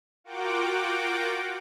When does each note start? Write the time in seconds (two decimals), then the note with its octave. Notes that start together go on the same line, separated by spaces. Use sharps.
0.24 F4 F#4 A#4 F#5 G5 D6